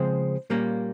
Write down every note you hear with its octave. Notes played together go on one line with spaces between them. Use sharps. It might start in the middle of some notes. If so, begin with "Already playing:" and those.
Already playing: C#3 F3 G#3 C4 C5
A#2 G3 A#3 C#4